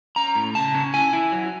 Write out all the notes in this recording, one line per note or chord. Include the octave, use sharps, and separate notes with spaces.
C#4 A#5
A2
C#3 A5
C#4
E4 G#5
E4
F#3